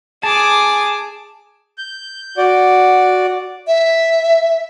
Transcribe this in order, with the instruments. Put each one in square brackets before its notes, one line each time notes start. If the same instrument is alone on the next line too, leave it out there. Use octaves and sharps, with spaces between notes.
[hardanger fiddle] G#4 D6 [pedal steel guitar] A5
[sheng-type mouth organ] G6
F#4 D5
[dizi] E5